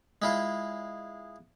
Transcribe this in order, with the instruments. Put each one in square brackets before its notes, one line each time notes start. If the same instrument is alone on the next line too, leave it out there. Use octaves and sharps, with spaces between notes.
[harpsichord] G#3 E4 F4